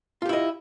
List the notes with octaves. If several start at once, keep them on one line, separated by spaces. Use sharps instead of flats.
E4 F4 G4 D#5